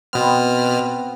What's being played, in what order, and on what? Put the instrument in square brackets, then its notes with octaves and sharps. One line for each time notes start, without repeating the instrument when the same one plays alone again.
[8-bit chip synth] B2 F6 [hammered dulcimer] B3 C4